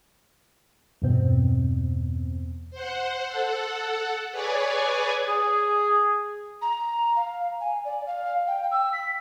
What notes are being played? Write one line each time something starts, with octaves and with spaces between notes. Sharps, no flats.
E2 G2 B2 C4
C5 F#5
A4 F#5
G#4 B4 C#5 D5 G#5
G#4
A#5
F5
G#5
D5
F5
G5
E6
B6